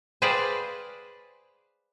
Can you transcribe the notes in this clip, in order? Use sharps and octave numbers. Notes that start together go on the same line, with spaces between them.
G#4 B4 C5 D5 F5 G5